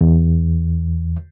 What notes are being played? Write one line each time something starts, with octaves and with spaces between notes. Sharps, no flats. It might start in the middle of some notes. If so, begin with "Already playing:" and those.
E2